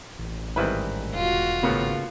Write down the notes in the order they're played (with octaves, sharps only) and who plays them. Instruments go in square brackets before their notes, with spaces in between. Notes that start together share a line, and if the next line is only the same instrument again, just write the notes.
[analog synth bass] A1
[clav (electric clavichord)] G#2 D#3 G3 [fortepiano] C4 E4 B4
[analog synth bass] E1 [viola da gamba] F4 F#4
[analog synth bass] G#1 [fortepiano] A2 A#3 B3 [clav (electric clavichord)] C#3